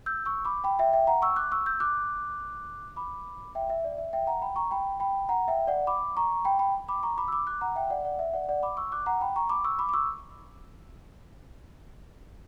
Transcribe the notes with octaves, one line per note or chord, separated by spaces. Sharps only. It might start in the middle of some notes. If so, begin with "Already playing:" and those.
E6 G6
C#6 E6
B5 D6
G5 B5
E5 G5
E5 G5
F#5 A#5
C#6 E6
D6 F#6
C#6 E6
E6 G6
D6 F#6
B5 D6
E5 G5
E5
D5
E5
E5 G5
F#5 A#5
G5 B5
A#5 C#6
G5 B5
G5 B5
F#5 A#5
E5 G5
D5 F#5
B5 D6
A#5 C#6
G5 B5
G5 B5
B5 D6
A#5 C#6
B5 D6
E6
B5 D6
D6 F#6
F#5 A#5
E5 G5
D5 F#5
D5 F#5
E5
D5 F#5
D5 F#5
B5 D6
C#6 E6
D6 F#6
F#5 A#5
G5 B5
A#5 C#6
B5 D6
C#6 E6
B5 D6
D6
C#6 E6